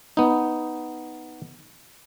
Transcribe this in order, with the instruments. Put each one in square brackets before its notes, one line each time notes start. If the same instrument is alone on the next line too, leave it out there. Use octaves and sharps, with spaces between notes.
[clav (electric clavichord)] B3 D#4